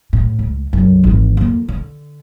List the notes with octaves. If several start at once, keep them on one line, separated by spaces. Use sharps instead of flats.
A2
C#2
C2 F#2
G#1 E3
F2 A#3
D3